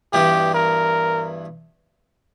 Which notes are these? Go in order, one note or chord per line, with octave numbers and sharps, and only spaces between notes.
G2 E3 B3 D4 F#4 G4
A#4